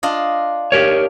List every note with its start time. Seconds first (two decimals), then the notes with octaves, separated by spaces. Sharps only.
0.03 D4 F4 D#5
0.72 G4 A#4 C#5